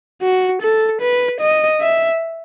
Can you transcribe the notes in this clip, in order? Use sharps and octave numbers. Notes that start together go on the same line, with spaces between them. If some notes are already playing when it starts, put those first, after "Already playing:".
F#4
A4
B4
D#5
E5